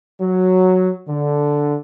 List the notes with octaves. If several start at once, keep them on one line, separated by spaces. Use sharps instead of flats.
F#3
D3